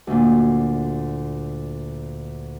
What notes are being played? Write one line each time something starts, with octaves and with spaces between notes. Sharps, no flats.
D2 A#2